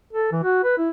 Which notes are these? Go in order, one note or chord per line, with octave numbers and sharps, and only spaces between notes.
A4
E3
F#4
B4
E4